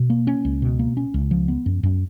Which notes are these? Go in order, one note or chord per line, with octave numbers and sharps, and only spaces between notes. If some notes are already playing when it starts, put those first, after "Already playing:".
Already playing: B2
A#3
C#4
C#2
B2
A#3
C#4
C#2
F3
B3
F#2
F#2